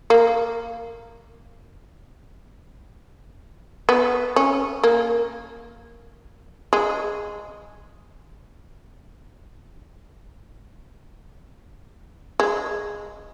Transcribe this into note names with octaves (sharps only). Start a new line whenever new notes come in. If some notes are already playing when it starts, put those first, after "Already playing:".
A#3
B3
C#4
A#3
G#3
G#3